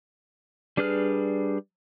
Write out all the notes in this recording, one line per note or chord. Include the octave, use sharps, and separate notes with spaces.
G3 D4 G#4 B4 F6